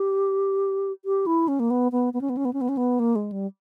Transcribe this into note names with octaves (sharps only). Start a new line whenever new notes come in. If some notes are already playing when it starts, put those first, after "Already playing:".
Already playing: G4
G4
E4
C#4
A#3
B3
B3
B3
C#4
B3
C#4
B3
C#4
B3
C#4
B3
A#3
G#3
G3